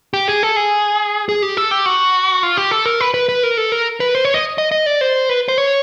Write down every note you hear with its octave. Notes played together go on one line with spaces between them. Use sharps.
G4
G#4
A4
G#4
G#4
G4
A4
G4
F#4
F4
G4
A4
A#4
B4
B4
B4
A#4
A4
A#4
B4
C5
C#5
D#5
D#5
D#5
D5
C5
B4
C5
C#5